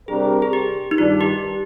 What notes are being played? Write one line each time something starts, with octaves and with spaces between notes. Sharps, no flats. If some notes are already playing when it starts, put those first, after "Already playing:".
C3 G3 D4 G4 G#4 A#4
G#4
G4
D#4
G2 D#3 G3 D4 F4
G4